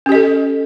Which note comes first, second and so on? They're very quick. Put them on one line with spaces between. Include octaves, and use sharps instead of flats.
C#4 G4 D#5 A4